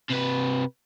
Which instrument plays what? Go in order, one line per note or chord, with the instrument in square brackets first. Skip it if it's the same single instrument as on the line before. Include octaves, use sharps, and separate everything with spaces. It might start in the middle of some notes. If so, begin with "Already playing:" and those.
[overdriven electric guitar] C3 B4